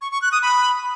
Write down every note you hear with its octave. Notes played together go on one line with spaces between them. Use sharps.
C#6
C#6
F#6
D#6
B5